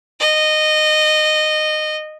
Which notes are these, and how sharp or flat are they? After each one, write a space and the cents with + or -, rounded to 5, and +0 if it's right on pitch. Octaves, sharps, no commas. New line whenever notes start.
D#5 -20